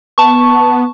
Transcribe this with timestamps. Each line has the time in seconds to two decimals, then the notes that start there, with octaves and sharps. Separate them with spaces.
0.18 B3 A5 C#6